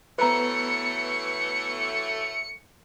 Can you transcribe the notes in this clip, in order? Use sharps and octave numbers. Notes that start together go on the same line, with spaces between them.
E3 F#3 A3 B3 B4 C5 A#5 C#7